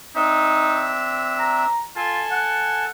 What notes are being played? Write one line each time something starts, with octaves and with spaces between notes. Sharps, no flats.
C4 D4 D#4 E5
A#5
F4 A4 G#5 A5
F#5